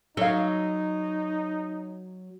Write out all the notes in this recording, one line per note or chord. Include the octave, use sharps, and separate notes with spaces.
F#3 D#4 A4 F5